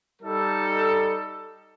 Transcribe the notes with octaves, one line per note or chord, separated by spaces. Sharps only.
G3 D#4 A4